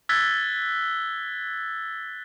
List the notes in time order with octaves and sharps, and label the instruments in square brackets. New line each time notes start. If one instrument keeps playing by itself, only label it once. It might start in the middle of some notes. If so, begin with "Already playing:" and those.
[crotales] E6 F#6 G#6 A6 B6 G7